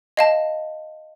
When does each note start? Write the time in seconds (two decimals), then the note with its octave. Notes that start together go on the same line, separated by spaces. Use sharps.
0.17 D#5 F5 A5